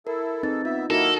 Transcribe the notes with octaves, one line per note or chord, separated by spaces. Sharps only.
E4 A4 A#4
G#3 C4 D#4 A4 B4 A6
B3 F4 E5
A#3 D#4 E4 F#4 A4 A#4 A#6